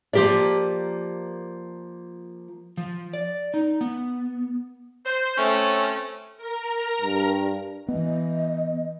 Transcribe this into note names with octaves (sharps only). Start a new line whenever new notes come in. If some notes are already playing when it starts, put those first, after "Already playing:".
F3 A#3 G4 A#4 D5
F3
D5
D#4
B3
C5
A3 C4 C#4
A#4 A#5
G2
E3 B3 D#5